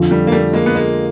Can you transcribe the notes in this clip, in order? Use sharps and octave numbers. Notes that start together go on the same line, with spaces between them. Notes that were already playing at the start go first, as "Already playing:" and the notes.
Already playing: F2 D3 F3
G3 A3
A#3
G3 A3
G#3 A#3
B3
G#3 A#3